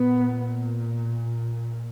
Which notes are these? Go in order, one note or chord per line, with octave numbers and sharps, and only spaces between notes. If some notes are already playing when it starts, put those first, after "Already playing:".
Already playing: A#2 B3